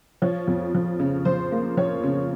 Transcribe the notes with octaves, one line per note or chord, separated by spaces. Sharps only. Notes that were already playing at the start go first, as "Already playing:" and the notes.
F3 C#5
F2
F3
C#3
F3 C5
A#3
F3 C#5
C#3